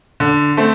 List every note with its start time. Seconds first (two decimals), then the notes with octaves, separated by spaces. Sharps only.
0.20 D3
0.57 A3 C4